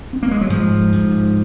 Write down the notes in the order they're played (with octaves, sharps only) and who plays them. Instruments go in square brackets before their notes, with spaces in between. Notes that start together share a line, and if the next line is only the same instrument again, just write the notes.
[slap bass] C4
A#3
G#3
F#3
G#2 F3
G#2